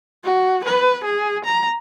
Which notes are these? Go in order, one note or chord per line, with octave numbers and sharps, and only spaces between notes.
F#4
B4
G#4
A#5